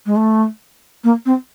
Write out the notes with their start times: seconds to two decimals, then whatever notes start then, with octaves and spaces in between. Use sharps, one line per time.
0.06 G#3
0.16 A3
1.04 A#3
1.25 C4